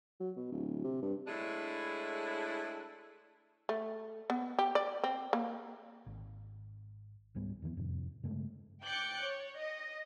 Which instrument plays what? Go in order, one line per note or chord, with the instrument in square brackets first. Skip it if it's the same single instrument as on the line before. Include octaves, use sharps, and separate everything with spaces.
[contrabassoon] F#3
B2
D1
C3
G2
[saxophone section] A2 G#3 D4 E4
[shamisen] A3
B3
G4
D5
C4
A#3
[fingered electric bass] G#1
C#2 G#2 G3 B3
E2 D#3 E3 B3
F2 A2 C3
G2 C#3 G#3 A3
[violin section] G5 D6 F#6 G6 A6 C#7
C#5
D#5